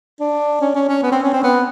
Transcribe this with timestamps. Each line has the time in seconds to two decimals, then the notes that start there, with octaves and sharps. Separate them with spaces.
0.20 D4
0.61 C#4
0.75 C#4
0.89 C#4
1.03 B3
1.12 C4
1.23 C#4
1.33 C4
1.43 B3